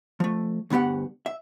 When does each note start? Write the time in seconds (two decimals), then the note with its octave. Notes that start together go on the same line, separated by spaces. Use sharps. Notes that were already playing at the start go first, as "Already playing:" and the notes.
0.20 F3 A3
0.70 D2 G2 B3 G4 F#5
1.26 E5